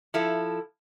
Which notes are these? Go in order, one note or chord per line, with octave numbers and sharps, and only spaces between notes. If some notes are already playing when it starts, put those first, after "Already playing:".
F3 E4 A4